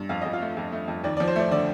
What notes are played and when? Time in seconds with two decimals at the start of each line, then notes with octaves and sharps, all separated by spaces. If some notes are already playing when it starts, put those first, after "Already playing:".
Already playing: G2
0.09 F2 F5
0.21 F2 D#5
0.33 F4 F5
0.41 A3
0.57 F2
0.72 A3
0.88 F2
1.04 D#2 D5
1.17 F3 D5
1.28 C5
1.36 A3 D5
1.51 D3 D5